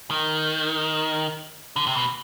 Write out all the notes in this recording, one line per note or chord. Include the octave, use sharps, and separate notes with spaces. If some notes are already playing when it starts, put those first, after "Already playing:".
D#3
D3
C3
B2